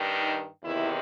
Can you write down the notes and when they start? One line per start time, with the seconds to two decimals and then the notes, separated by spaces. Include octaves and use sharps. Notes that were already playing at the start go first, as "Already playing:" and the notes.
Already playing: G2 D#3
0.20 D#4
0.62 E2 C3 D#3 E4